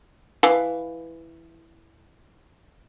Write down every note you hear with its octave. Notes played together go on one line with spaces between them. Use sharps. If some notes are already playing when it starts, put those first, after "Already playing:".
E3 B4 F5